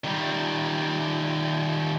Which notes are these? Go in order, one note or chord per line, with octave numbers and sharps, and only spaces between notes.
D#3 G3